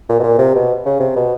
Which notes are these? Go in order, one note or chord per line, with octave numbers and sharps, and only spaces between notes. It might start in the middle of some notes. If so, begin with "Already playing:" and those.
A#2
B2
A#2
C3
B2
C#3
C3
B2